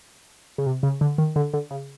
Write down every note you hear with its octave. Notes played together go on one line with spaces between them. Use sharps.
C#3
C3
C#3
D3
D#3
D3
D3
C#3